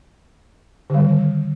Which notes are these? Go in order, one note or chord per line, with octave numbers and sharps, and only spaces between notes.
D3 D#3 G3